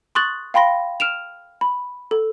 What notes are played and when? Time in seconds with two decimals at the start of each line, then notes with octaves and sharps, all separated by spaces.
0.15 C6 C#6 D#6 F#6 A6 F#7
0.54 F5 G5 B5 C6 A#6
1.00 F6 D7 E7 F7
1.61 B5
2.11 A4